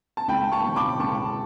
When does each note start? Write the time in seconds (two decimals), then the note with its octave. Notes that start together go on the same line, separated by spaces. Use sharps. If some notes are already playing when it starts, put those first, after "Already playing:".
0.17 A5
0.28 C#2 G5 B5
0.52 A5 C#6
0.63 B2
0.69 F#3
0.76 B5 D6
0.99 C#2 A5 C#6